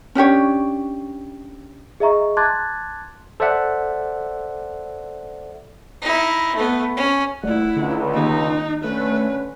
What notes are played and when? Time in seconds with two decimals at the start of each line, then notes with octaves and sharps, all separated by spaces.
0.15 C#4 D4 G4 C#5
2.00 G#4 D#5 E5 A#5 C#6
2.37 A5 C6 D6 F#6 G#6 A6
3.40 A4 C5 D5 E5 F#5
6.02 D#4 E4
6.55 A3 B3
6.97 C#4
7.43 D#1 A3 E4 D5 F#5
7.76 C#2 D3
8.14 D#3 A#3 D#4 G4
8.84 D3 A3 C#4 B4